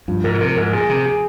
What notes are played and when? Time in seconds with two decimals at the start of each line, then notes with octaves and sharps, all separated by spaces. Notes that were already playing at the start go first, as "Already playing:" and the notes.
0.08 G2 F3
0.24 G#2 A#4
0.34 A#2
0.41 C3 A#4
0.57 G#2 A#4
0.73 A#2 G#4
0.89 C3 G#4
1.06 G#4